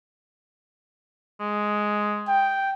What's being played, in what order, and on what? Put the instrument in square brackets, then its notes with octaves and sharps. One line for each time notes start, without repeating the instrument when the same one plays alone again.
[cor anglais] G#3
[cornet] G5